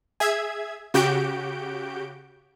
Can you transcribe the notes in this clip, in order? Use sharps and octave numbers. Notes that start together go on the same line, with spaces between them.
G#4 E5 G#6
C#3 F#4 G4 G6 D7